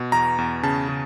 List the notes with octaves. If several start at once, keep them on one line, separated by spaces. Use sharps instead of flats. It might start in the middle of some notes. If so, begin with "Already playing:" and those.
Already playing: B2
E2 A#5
E2
C#3 A5
C#3